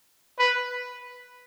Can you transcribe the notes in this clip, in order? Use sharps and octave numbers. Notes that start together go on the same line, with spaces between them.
B4